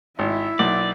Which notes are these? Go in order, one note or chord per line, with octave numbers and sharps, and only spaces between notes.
G#1 E4 E5
B1 A#3 D5